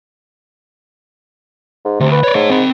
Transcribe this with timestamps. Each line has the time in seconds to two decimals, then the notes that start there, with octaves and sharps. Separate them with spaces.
1.85 G#2
2.00 D2 C3
2.12 B4
2.23 C#5 D5
2.35 G#2 A3 C#5
2.50 C4 B5